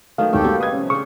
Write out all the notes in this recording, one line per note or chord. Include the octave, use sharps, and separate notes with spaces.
D#3 F#3 A3 B3 F5
D1 G#2 A3 G4 A4 G5
G3 A#3 F#4
G2 C#3 G#3 B4 D#6 G#6
C3 F3 C#4
C#3 D4 C#6